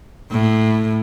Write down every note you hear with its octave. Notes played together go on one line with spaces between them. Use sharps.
A2